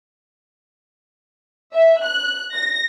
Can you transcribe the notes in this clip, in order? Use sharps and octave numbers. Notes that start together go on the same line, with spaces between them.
E5
F#6
A#6